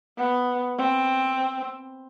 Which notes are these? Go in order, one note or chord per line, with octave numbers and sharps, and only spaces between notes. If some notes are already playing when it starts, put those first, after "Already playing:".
B3
C4